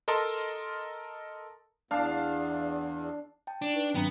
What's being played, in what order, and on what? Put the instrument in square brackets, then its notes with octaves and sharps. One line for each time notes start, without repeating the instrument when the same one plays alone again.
[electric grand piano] A4 A#4 D#5 A5 C6
[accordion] E2 [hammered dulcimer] D4 [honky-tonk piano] F5 A5
[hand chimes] G5 A5
[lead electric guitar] D4
[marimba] D#4 B4
[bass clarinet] G2 [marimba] D#3 F#3 C4 [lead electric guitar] B3 [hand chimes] G5 A#5